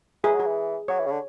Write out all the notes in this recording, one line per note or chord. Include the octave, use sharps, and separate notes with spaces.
E3 G#4
F#3 G#4
E3
F#3 C#5
E3
C#3
D3